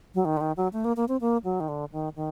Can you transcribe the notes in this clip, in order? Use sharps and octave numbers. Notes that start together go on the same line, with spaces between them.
F#3
D#3
D3
D#3
F#3
A3
A#3
A#3
C4
A#3
F#3
D#3
D3
D#3
D#3